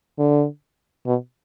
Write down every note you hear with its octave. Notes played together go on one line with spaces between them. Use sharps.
D3
B2